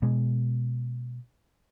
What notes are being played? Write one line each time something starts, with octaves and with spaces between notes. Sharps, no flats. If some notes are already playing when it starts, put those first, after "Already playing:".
B2 G#3